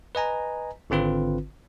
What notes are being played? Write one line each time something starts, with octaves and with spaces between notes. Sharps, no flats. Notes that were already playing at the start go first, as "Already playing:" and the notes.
B4 D#5 G#5 A#5
G#1 D3 C4 F4 B4